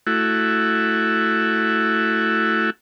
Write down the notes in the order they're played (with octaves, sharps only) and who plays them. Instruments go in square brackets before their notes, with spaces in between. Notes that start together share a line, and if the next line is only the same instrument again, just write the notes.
[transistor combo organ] A3 E4 F#4